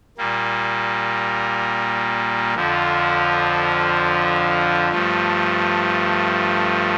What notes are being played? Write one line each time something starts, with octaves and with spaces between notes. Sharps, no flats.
A#2 G3 A#3
F2 D3 F3
G2 F3 A3